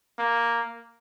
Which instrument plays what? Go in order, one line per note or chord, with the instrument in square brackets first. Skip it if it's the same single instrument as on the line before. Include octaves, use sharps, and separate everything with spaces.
[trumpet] A#3